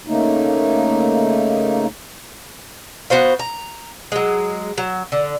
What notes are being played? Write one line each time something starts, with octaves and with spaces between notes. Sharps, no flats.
C#3 A3 A#3 D#4
B3 F#4 C5 F5
A#5
F#3 G#3
F#3
D3